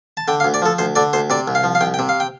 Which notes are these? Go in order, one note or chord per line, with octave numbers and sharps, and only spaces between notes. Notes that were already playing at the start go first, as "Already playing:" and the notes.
A5
D3 G5
F5
D2
D5
F3 A4
D2 C5
D3 D5
D2 C5
C3 D5
C2
F5
F3
F5
C2 G5
G5
C3
F5
G5